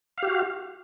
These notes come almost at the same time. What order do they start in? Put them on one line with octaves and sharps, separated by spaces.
F5 G4 F#4